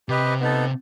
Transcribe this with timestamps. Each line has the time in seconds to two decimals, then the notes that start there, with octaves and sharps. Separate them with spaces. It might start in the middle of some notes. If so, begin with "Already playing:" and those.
0.09 C3 G4 B4 D#5
0.40 B3 D#4 A4